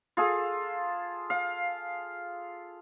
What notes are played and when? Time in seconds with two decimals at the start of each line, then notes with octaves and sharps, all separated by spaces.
0.17 F4 G#4 A4
1.30 F5